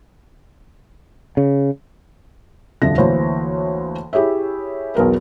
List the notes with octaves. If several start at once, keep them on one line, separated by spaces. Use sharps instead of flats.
C#3
D#1 F2 D3 F3 E5 A#6
D2 E3 A#3 C5 C#5
E4 G4 G#4 C#5 E5
B1 E2 A#4 B4